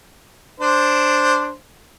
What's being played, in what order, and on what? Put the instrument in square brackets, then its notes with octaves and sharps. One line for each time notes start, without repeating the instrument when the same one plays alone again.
[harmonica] D4 C5